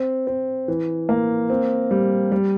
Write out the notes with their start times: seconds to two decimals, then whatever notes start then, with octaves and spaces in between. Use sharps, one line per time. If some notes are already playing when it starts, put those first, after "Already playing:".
Already playing: C4
0.27 C4
0.68 E3
1.09 A#3
1.50 C4
1.91 G3
2.32 G3